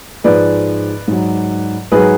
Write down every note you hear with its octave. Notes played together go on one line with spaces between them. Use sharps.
G#2 F3 G#3 B4 D5
G#2 F#3
G#2 F#3 G#4 B4